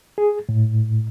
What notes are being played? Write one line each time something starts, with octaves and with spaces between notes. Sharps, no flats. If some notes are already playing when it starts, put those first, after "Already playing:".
G#4
A2